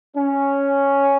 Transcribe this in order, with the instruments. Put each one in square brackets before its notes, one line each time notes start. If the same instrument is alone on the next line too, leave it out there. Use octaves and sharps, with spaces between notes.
[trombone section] C#4